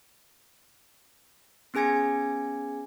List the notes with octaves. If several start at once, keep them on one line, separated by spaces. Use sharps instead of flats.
B3 C#4 G#4 G#5 G#6 C#7